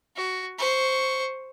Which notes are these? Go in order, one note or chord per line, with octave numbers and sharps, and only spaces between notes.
F#4
C5 C#6